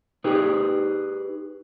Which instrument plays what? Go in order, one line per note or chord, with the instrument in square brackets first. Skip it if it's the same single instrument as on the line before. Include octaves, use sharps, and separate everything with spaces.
[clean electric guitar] D#4 G4 G#4 B4